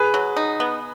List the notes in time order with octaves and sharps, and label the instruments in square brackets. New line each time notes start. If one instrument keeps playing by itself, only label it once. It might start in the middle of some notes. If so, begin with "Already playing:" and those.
Already playing: [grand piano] G#4 B4
[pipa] F#3
D#4
B3